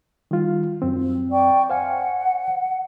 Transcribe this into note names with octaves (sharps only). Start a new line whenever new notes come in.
D#3 G3 F4
F#2 C4
D5 G5 C#6
C5 F5 F#5 G#5